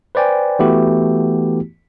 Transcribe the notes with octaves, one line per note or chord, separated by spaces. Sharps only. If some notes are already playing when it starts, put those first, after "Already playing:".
B4 C5 D5 G5 G#5
E3 A3 B3 E4 F#4 G4